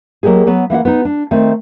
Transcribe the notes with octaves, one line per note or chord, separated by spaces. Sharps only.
F#3 G#3 A#3 G4 G#4
F#3 B3
E3 A#3 E5 F#5
B3 D#4
D4
D#3 A3 C4 D#4